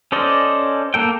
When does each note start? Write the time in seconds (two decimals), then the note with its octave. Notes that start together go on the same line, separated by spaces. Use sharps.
0.12 C#4 A4 C5 D5 D#5
0.94 A#3 A4 G5